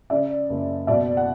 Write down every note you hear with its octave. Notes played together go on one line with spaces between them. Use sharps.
C#3 D5 E5
F#1
B2 D5 E5
F#5